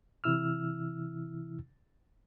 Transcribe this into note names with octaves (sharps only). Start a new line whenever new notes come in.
C3 E3 E4 E6 F6